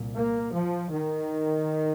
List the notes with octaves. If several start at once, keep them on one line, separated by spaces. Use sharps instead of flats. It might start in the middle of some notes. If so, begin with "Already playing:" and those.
Already playing: C2 A#2
A#3
F3
D#3